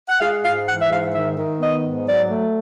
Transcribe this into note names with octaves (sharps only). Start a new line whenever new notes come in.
F#5
G#3 F5
G#2 F5
E3 F#5
E5
G#2 F5
D#3 E5
D#3
B3 D#5
G#2
F#3 D5
A3